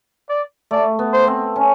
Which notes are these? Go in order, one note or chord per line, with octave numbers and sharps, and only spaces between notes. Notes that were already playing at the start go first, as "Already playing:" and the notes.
D5
A3 D5
B3
C5
C4
C#4